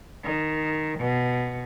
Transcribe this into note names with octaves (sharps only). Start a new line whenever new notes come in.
D#3
B2